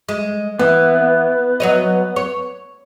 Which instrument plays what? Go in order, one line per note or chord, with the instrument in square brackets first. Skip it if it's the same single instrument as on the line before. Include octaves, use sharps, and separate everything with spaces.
[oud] G#3
[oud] E3 [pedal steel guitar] B3
[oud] F#3 C#5 D#5
C#5